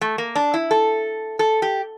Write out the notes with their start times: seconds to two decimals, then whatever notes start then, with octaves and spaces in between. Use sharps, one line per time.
0.01 A3
0.18 A#3
0.36 D4
0.54 E4
0.71 A4
1.39 A4
1.62 G4